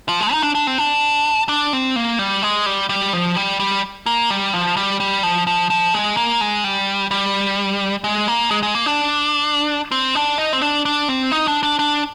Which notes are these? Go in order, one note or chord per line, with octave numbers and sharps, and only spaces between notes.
F3
G#3
D#4
D4
D4
C4
D4
D4
C4
A#3
G3
G#3
G3
G3
F3
G3
G3
A#3
G3
F3
G3
G3
F3
F3
F3
G#3
A#3
G#3
G3
G3
G#3
A#3
G#3
G#3
A#3
D4
C4
D4
D#4
C4
D4
D4
C4
D#4
D4
D4
D4